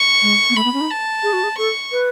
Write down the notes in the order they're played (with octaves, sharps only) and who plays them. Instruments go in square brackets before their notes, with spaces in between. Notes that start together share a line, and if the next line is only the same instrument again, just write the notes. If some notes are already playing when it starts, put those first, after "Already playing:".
Already playing: [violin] C#6
[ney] G#3
B3
[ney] A3 [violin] B5
[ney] B3
C#4
D#4
[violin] A5
[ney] G#4
F#4
G#4
[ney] A4 [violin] C#6
[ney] B4